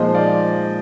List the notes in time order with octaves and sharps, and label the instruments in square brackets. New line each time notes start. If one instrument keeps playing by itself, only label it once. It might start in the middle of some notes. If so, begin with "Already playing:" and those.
Already playing: [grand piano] A#2 F3 G#3 D#4 C5 D#5
D5 F5